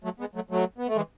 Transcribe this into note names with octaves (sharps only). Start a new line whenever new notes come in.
F#3 A3
G#3 B3
F#3 A3
F#3 A3
B3
A3
E3 G#3